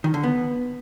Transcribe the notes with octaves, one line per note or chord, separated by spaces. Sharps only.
D#3
D3
B3